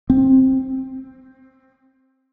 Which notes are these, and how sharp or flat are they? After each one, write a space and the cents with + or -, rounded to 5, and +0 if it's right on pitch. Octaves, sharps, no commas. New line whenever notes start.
C4 +10